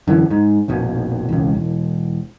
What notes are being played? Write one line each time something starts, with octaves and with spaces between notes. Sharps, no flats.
F#2 D3 E3
G#2
F1 A#1 B2
E1 C#2
E1